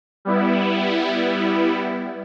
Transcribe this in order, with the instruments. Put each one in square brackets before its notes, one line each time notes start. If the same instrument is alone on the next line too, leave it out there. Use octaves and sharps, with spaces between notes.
[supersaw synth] G3 B3 E4